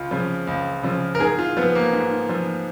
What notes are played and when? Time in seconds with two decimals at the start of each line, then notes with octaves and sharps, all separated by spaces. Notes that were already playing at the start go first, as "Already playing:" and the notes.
Already playing: C#2 F4
0.11 C#3 F3
0.47 C#2
0.83 C#3 F3
1.15 A#4
1.19 G#2 G#4
1.39 F4
1.57 F3 B3
1.75 A#3
1.93 G#2
2.29 F3